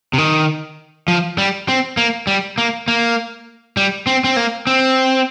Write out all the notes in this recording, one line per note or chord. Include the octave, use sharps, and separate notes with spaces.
C3
D#3
F3
G3
C4
A#3
G3
A#3
A#3
G3
C4
C4
A#3
C4